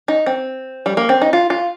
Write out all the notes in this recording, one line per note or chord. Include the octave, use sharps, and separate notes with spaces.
D#4
C4
G3
A#3
C4
D#4
F4
F4